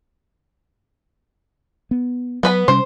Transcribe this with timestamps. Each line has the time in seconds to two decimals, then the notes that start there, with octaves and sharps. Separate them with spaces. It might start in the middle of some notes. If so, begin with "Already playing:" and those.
1.91 B3
2.43 F#3 B3 B4 B5
2.68 C3 G3 C#4 C5